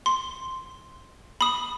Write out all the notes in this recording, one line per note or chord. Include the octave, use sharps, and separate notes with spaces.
C6
B5 D#6